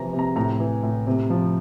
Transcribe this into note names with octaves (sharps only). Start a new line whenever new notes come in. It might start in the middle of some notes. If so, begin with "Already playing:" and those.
Already playing: C3 E3 F3 A#5
C3
A#5
A2 A#5
E3
A2
C3
F3